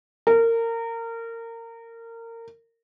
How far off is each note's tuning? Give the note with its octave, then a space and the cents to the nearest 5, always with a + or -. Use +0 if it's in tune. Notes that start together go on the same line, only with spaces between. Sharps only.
A#4 -25